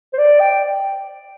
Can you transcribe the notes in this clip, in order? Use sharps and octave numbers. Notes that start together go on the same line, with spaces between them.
C5
D5
G5